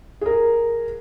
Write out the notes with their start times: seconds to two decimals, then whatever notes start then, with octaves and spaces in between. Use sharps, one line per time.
0.21 G#4 A#4